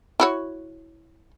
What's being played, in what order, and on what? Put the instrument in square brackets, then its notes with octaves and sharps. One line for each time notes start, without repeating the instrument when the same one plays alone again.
[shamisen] E4 F#4 C#5